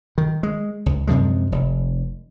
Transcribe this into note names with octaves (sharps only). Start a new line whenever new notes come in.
D#3
G#3
C#2
F#2 C3 F3 G#3
F1